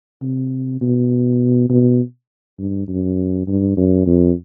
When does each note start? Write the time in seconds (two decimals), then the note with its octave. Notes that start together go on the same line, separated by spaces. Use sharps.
0.22 C3
0.81 B2
1.70 B2
2.59 G2
2.88 F#2
3.47 G2
3.77 F#2
4.07 F2